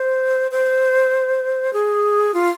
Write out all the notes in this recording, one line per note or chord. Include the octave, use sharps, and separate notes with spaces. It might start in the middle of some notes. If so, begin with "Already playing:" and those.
Already playing: C5
C5
G#4
F4